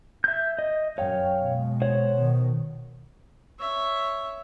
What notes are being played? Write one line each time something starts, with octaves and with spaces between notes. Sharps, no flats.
E5 G6
D#5
F#2 C#5 F5 G5
B2 G#3
C5 C#5 F#5
B2 D#3
C#5 E5